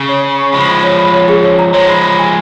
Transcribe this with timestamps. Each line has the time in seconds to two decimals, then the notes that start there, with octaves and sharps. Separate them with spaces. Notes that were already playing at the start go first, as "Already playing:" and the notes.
Already playing: C#3
0.09 C#5
0.24 C#5
0.39 C#6
0.54 F3 G#3 B5
0.69 B5
0.84 C#5
0.99 B5
1.14 C#5
1.29 G#4
1.44 C#5
1.59 A#5
1.74 F3 G#3 C#5
1.89 B5
2.04 B5
2.19 G#5